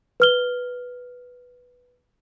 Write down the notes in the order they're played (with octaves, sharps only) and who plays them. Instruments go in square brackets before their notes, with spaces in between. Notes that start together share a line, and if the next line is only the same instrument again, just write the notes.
[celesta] B4 F6 G7